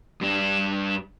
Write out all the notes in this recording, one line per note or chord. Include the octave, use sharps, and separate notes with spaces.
G2 D4